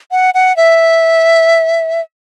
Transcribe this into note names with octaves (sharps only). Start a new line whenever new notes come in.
F#5
F#5
E5